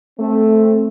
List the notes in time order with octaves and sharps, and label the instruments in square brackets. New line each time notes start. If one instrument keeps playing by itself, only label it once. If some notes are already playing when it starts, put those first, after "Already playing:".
[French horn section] A3 C4